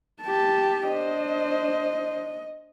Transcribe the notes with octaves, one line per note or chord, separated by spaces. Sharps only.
G4 A5
D4 C5 D#5